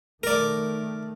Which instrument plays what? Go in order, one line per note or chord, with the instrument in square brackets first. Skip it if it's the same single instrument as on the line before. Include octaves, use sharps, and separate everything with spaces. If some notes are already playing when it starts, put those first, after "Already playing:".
[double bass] D#3 A3 [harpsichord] A#4 D5